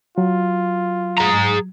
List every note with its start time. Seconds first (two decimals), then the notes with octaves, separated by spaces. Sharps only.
0.18 F#3 F4
1.18 G#4 A#5